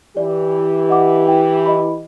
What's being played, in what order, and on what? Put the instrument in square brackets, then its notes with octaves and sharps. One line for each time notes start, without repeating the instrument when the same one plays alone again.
[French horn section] E3 G4 [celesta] D5
[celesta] D#5 F#5 D6
E4 G5
E4 D#5 B5